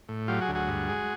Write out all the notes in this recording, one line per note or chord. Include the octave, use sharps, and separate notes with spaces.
A2
F#3 F4 G4
F#4 G#4
D2
F#4 G#4
G2
G#3